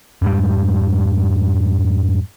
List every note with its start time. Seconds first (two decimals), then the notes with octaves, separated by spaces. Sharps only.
0.22 F2 G#2 G3